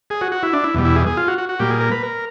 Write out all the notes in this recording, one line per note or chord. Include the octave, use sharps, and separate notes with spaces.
G#4
F#4
F#4
E4
D4
E4
E2 B2 G3
E4
G#4
G#4
F4
F#4
F#4
F#4
A#2 G3 A#3 G4
G#4
A#4
B4
A#4